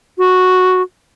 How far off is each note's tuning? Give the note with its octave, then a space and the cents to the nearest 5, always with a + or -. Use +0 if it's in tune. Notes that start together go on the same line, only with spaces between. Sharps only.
F#4 -5